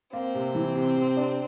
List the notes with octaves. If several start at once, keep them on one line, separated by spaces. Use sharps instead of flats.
A#3 C4
C3
E3
C3
C3
D4